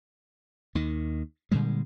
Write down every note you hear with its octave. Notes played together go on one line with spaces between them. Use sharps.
D#2 D#3
A#2 D3 G3 G#3